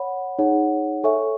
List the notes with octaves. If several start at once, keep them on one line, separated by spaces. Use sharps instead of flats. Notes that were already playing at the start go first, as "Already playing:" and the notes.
Already playing: C#5 F#5 B5
D#4 G#4 C#5 F#5
A4 C#5 E5 G#5 C#6